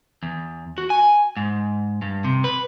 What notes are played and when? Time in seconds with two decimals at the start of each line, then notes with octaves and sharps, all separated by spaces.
0.23 E2
0.78 F#4
0.90 G#5
1.37 G#2
2.02 G2
2.24 C3
2.44 B4